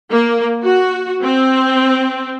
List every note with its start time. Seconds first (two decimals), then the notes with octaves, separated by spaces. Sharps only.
0.11 A#3
0.64 F#4
1.24 C4